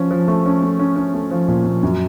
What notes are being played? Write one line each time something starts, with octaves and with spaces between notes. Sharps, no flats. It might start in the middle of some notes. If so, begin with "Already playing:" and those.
Already playing: F3 C#4
F3
A3
C#4
A3
C#4
C#4
A3
F3
A#2
A#2
F#2